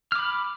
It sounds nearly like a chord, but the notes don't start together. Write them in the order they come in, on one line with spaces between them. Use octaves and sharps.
F6 D6 B5